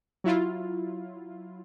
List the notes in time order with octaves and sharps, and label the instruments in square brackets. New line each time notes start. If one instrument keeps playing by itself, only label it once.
[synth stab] F#3 E4 F4